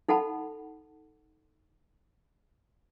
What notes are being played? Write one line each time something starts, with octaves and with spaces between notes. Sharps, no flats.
D#4 A4 F#5 A5 B5